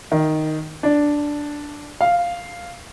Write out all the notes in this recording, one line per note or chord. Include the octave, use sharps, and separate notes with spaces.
D#3
D4
F5